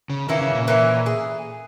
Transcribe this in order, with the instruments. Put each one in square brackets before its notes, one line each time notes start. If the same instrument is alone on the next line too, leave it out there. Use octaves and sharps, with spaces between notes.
[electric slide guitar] C#3
[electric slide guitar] D#3 [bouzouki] E3 A#3 C#4 E4
[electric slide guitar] C#3
A#2
[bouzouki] E3 A#3 C#4 E4
G#4